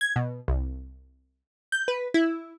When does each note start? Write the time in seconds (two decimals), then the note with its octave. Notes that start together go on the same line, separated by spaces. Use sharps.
0.01 G#6
0.16 B2
0.48 C2
1.72 G6
1.88 B4
2.14 E4